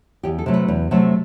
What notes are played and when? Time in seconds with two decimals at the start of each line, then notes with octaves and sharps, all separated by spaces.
0.23 E2 G4
0.39 A4
0.46 C3 F#3 A3
0.54 B4
0.68 E2
0.91 C3 F#3 A3